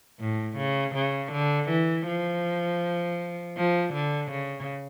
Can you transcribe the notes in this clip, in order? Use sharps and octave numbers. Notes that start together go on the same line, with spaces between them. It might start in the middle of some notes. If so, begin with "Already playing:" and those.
A2
C#3
C#3
D3
E3
F3
F3
D3
C#3